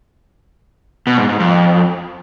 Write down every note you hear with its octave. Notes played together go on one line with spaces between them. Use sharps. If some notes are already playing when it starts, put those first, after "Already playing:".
B2
G#2
G#2
F2